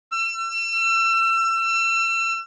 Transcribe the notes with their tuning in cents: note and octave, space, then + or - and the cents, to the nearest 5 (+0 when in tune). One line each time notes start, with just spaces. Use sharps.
E6 +35